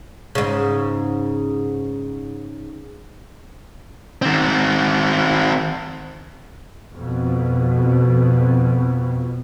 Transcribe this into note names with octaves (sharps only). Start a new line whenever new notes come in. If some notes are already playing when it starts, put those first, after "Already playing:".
G#2 C#3
D#3 C4
F2 B2